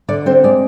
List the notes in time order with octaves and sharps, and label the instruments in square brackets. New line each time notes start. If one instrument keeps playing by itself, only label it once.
[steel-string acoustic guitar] D3 D5
C4 C5
G#3 D5